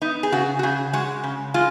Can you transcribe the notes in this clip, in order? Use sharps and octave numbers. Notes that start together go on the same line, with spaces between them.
B3 D#4
G#4
C#3 F#4
F#4
C#3 G#4
G#3 F#4
C#3
G#3 F4